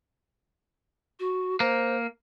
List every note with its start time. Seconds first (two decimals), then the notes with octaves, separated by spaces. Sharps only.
1.20 F#4
1.60 A#3 C5